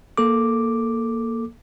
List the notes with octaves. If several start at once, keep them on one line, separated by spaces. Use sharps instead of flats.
A#3 A4 D6